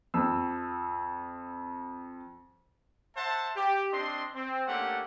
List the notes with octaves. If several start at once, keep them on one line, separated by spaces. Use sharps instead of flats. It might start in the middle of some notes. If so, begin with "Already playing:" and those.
F2 E6
C5 E5 F#5 A5
G4
C4 D4 D#5 C6
C4
A3 A#3 C#4 D4 G4 F#5